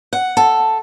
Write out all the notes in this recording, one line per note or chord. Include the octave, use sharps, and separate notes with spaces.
F#5
A4